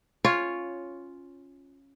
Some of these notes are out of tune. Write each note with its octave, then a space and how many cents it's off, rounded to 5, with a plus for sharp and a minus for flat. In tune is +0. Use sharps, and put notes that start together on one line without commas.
C#4 -5 F4 +0 C#5 +0